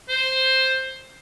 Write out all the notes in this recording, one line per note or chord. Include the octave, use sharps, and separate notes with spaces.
C5